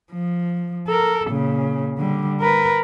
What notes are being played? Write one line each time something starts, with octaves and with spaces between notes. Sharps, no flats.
F3
A4 A#4
A#2 C#3
D3 G3
A#4 B4